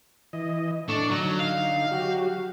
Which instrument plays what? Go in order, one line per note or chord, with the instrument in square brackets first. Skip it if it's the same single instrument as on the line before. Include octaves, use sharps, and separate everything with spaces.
[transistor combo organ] E3 D#5
[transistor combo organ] A2 A4 C#6 [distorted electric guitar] D4
[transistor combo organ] D3 D#4 [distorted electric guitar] F#3
[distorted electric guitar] F5
[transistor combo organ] F#3 F#4 G4